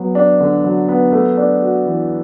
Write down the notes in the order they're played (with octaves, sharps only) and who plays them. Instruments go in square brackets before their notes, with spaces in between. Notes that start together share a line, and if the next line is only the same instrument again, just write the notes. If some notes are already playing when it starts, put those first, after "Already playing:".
Already playing: [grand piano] F#3 B3
D4
D3
F#3
B3
A3
D4
F#4
E3